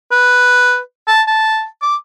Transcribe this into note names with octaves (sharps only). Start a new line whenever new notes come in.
B4
A5
A5
D6